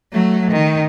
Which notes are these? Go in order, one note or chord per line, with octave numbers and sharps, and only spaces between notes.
F#3 A3
D#3